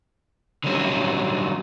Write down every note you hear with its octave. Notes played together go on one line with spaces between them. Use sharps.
D3 D#3 F#3 G3 C#4